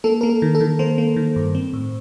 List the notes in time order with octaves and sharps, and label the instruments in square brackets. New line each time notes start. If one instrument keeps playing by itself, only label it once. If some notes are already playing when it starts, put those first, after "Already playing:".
[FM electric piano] A#3 A4
A#3 A#4
A4
D#3
A4
D#3
A#3 C5
A#3
D#3
G2
C4
A2